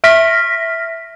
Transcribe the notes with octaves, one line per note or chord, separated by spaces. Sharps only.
E5 F6 A#6 B6